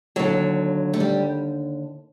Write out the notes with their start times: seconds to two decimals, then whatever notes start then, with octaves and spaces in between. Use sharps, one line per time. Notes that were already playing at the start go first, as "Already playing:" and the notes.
0.16 D#2 D3 F#3
0.94 A3
1.00 G3